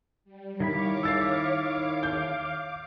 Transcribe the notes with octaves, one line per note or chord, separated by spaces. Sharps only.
G3
D#3 E4 C#5 F5 B5 D6
E6 A6 C7
G6